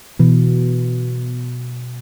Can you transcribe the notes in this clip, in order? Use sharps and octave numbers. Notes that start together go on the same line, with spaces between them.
B2 E3